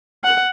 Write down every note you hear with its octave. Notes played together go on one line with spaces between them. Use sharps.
F#5